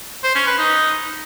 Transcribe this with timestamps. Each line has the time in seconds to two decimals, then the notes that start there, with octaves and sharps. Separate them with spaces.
0.24 C5
0.35 C#4
0.47 B4
0.58 D#4